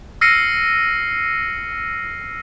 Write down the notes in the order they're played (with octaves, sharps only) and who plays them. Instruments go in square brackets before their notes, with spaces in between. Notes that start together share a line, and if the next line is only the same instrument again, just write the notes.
[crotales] E6 F6 A#6 C7 C#7 D#7